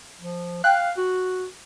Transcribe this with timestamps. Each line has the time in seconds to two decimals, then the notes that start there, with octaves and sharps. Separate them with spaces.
0.21 F3
0.64 F5 G5 F#6
0.97 F#4